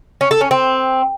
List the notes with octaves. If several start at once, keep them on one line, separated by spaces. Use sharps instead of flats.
C#4
A4
C#4
C4